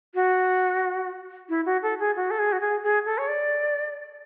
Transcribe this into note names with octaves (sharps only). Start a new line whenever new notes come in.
F#4
E4
F#4
A4
G#4
F#4
A4
G#4
F#4
G#4
G#4
A4
C#5
D5